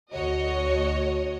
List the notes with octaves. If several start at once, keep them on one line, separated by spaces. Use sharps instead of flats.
D2 F#4 C#5 D#5